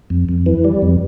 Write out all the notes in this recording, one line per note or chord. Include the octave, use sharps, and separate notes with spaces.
F2
F2
E3
G3
F2